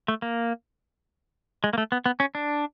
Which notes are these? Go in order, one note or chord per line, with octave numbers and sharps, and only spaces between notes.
A3
A#3
G#3
A#3
A3
B3
B3
C#4
D4